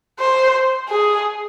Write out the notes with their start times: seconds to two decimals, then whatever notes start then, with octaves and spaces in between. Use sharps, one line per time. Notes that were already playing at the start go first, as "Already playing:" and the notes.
0.20 C5
0.89 G#4